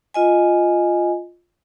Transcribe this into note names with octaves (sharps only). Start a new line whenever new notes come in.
F4 D#5 G#5